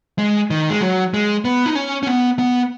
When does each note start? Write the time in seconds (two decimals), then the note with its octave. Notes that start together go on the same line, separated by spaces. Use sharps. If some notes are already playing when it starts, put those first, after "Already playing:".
0.18 G#3
0.50 D#3
0.70 G#3
0.81 F#3
1.14 G#3
1.45 B3
1.66 D#4
1.75 C#4
2.03 C#4
2.07 B3
2.39 B3